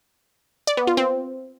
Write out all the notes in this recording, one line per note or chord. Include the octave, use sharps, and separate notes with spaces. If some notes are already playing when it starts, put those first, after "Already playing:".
D5
B3
F4
C4